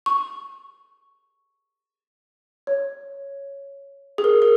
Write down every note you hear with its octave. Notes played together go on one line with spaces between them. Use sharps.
C#6
C#5
G#4
A#4
A#4